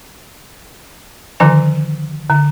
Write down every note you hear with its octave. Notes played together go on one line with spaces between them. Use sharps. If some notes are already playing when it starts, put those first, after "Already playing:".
D3 D#3 F3 G#5
D3